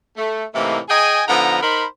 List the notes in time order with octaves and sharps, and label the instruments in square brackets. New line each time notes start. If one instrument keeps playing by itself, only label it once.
[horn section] A3
A2 C3 E3 A3 A#3 D#4
G#4 D#5 G5 G#5
D3 F3 B3 D#4 A#5
D#4 A#4 C5 B5